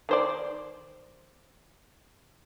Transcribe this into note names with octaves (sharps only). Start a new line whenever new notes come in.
D#3 C5 D5